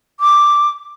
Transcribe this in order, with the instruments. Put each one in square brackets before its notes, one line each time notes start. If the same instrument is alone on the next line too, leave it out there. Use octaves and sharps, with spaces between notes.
[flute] D6